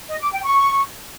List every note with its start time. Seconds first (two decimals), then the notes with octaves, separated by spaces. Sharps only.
0.09 D#5
0.20 D6
0.32 G5
0.44 C#6